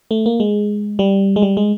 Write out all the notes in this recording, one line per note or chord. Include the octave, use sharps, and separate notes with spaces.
A3
A#3
G#3
G3
G#3
G3
G#3